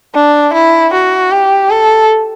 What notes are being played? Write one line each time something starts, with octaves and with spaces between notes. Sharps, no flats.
D4
E4
F#4
G4
A4